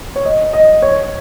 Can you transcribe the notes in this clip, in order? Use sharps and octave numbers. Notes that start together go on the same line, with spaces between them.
C#5
D#5
D#5
C#5